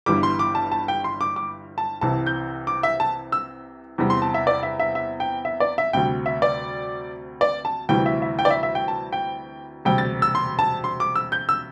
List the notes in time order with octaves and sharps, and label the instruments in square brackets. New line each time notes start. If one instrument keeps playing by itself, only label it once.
[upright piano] G1 G2 E3 G3 D6
C6
D6
A5
A5
G5
C6
D6
D6
A5
C2 C3 E3 A5
G6
D6
E5
A5
E6
E2 C3 E3 G3
C6
A5
E5
D5
E5
E5
E5
G5
E5
D5
E5
D2 C3 G3 G5
E5
D5
D5
A5
D2 C3 E3 G3 G5
E5
E5
G5
D5
E5
E5
G5
A5
G5
E1 D2 C3 G3 G5
A6
E6
C6
A5
C6
D6
E6
G6
E6